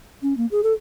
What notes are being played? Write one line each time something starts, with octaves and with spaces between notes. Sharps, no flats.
C#4
A#3
G#4
A4